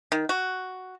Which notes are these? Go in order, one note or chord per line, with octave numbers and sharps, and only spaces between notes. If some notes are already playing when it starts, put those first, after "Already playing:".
D#3
F#4